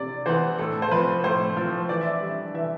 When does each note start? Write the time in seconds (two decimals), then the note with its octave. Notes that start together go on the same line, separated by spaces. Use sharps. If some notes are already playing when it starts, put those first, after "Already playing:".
Already playing: C3 D5
0.26 E3 B3 C5
0.58 A2 A4
0.82 C5
0.91 F3 C4 B4
1.24 A2 C5
1.57 F3 C4
1.89 E3 D5
2.01 E5
2.13 D5
2.21 G3 D4
2.54 E3 E5